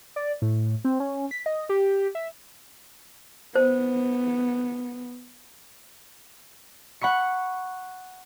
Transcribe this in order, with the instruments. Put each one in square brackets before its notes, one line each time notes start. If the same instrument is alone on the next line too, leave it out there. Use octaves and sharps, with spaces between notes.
[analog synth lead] D5
A2
C4
C#4
B6
D#5
G4
E5
[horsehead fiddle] B3 [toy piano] C5
[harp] F#5 B5 C#6 C#7